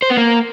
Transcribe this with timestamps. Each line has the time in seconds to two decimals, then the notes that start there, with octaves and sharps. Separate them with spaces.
0.02 C5
0.10 B3
0.17 A#3